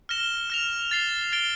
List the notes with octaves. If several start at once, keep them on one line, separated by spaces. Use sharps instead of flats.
F6 A#6 E7 G7
F6 A#6 F7
A6 C7 G7
A6 D7 G7